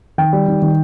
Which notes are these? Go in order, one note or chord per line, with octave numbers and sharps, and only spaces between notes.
D#3 G5
G3
D#3
D#3